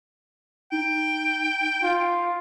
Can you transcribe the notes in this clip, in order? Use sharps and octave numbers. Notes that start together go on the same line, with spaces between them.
D#4 G5
F4